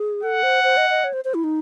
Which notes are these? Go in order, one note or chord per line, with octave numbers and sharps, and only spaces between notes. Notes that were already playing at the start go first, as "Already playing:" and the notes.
Already playing: G#4
A4 F#5
C5
C5
D#5
D#5
C#5
C5
C5
E4
D#4